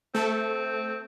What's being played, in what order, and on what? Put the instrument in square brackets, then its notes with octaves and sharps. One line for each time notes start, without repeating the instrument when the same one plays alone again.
[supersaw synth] A3 A4 [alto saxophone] C4